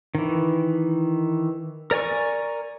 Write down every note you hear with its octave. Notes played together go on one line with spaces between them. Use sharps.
D#3 E3
A#4 D5 G#5 C#6